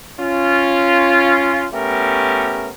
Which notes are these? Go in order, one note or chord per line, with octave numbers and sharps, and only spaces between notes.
C#4 F4
A3 B3 C#4 G4 A#4